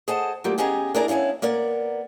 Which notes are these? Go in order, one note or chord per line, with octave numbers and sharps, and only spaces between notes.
G#4 C5 D#5 F#5 A5
F#3 G3 A3 A#3 F4 G4
B3 C#4 G4 G#4 D#5 A#5
D4 E4 G#4 A#4 D5 A#5
B3 C#4 E4 C#5 F5
A#3 B3 A#4 D5